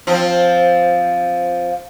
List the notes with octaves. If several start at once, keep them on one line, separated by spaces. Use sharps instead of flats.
F3 C4